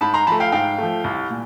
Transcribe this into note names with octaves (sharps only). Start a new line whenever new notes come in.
G#2 A5 B5
A#5 C6
F3 A3 A5 B5
F5 G5
G#2 F5 G5
F3 A3
C2
A#2